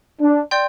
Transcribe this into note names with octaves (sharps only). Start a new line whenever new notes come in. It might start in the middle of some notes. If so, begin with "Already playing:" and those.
D4
D5 G5 C6 G6